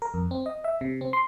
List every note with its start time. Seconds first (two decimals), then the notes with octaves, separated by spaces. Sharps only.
0.02 A#4
0.14 F2
0.31 C4
0.46 D#5
0.64 E5
0.81 C3
1.01 C4
1.13 C6